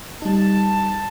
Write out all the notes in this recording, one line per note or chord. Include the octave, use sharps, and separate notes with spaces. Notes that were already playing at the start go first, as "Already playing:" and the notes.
G3 D#4 A5